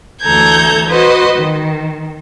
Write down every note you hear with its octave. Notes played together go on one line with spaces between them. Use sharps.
D2 E3 A4 A#5 G6 G#6
F#4 B4 C5 D#5
D#3